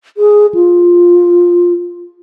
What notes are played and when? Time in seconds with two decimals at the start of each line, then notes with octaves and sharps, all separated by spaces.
0.17 G#4
0.54 F4